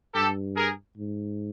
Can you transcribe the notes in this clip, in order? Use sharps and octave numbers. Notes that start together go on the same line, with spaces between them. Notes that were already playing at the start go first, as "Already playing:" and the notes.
G2 G4 A4
G#4 A#4
G#2